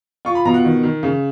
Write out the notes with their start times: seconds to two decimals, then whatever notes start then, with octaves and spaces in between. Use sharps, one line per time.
0.25 F4 C#6
0.35 B5
0.45 B2 A#5
0.54 F#5
0.65 D#3
0.83 D#3
1.03 C#3